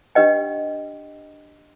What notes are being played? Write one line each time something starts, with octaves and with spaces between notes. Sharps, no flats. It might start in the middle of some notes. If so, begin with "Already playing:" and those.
D4 G4 B4 D#5 F#5 G5